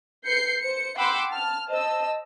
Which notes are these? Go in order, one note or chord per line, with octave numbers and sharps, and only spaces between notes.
B4 G6 C7 C#7
C5 C#7
F#5 G5 B5 C6 D6 E6
A5 F6
C5 D#5 A5 E6